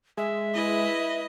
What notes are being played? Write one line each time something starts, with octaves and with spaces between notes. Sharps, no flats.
G#3 E5
E4 B4 D#5